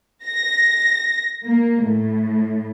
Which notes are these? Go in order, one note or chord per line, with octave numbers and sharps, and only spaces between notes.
A#6
A#3
A2